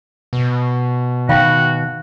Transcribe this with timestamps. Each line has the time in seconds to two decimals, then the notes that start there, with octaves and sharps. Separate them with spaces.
0.33 B2
1.29 D#3 F#4 F5 G5 B5